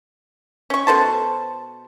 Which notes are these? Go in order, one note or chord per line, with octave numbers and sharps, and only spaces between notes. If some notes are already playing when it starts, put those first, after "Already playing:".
C#4 C#6
B2 A4 C5 A5